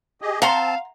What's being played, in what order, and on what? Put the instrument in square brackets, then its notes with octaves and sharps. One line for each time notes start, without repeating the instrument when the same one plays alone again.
[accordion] G4 G#4 D#5
[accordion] C4 A5 [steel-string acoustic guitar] F5 [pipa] F#5 A#5 C6